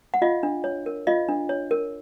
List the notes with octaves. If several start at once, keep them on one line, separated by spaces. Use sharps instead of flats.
F#5
F4 D#5 F5
D4
C#5
A#4
F4 D#5 F5
D4
C#5
A#4